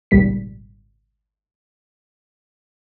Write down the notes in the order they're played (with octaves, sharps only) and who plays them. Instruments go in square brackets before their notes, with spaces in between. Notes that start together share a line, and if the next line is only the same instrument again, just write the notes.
[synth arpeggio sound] G#1 C#2 A#2 G3 B6